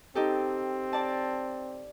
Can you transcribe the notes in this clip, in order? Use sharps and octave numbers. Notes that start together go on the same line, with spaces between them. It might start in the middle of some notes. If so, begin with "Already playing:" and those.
C4 D#4 G4 A4
D5 A5